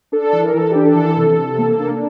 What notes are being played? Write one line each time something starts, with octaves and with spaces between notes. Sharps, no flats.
D4 A4
E3
A#4
E3 A4
D4 G4
A4
E3
C3
C3
A#3
D4